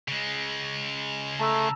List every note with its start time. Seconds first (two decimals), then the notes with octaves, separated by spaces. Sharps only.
0.08 C#3 G#3
1.40 A3 A5 A#5 E6